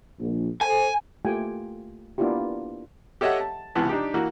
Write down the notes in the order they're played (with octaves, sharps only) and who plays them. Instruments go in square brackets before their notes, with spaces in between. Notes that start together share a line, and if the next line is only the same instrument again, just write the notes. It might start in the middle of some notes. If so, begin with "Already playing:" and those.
[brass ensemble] A#1
[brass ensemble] A4 C5 [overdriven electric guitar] G#5
[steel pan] A3 A#3 F4 G4 G5 G#5
A#3 B3 D4 E4 F4 G4
[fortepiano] G4 A4 C#5 D#5 E5 F#5
A5
C#2 C3 E3 B3 A5
D4 D#4 G4
E3 A#3 F#4